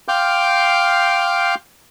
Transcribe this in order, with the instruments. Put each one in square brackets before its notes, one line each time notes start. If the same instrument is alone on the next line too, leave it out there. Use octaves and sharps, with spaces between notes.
[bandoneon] F5 G5 C6 D6 F6 G6